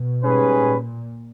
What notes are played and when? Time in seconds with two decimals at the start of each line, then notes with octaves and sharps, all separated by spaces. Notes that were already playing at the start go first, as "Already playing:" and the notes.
Already playing: B2
0.22 G#2 G3 C#4 G#4 B4
0.60 A#2